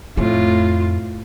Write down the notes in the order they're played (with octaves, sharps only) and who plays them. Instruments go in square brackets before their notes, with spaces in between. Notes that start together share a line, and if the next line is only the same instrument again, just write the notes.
[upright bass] F2 A3 [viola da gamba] A2 F4